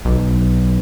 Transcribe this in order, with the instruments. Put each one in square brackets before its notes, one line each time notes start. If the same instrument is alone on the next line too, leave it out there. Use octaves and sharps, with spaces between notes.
[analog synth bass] B1